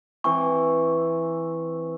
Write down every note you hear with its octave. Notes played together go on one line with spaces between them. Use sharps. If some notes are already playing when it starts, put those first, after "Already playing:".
E3 C4 C#6